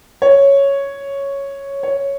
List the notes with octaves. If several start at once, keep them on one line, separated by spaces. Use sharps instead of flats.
C#5
C#5